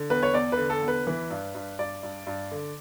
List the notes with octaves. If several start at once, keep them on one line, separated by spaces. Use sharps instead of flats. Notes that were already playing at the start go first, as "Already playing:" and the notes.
Already playing: D3
E2 B4
C#5
E2 D5
B4
D3
A4
E2
B4
E3 B4
G2
G2
G2 D5
G2
G2
D3